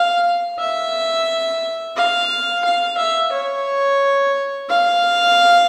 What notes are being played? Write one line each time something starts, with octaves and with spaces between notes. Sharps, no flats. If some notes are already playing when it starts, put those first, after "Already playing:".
Already playing: F5
E5
F5
F5
E5
C#5
F5